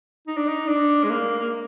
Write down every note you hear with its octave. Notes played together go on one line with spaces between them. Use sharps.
D#4
D4
D#4
D4
G#3
A#3
A#3